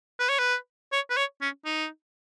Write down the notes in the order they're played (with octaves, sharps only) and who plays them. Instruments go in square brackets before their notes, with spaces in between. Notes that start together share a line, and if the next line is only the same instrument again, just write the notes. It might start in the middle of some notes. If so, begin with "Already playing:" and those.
[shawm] B4
C#5
B4
C#5
B4
C#5
C#4
D#4